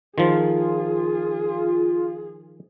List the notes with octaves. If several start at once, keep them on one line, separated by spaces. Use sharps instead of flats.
D#3 F3 F4 G#4